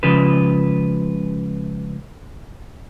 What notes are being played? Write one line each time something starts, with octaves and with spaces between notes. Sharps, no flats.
C#2 C#3 F3 B4